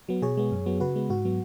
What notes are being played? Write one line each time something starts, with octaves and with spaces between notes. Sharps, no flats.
F#3 B3
B2 G#4 C#5
G#3 B3
F#2
F#3 B3
C#3 F#4 B4
G#3 B3
G#2 F#4
F#3 B3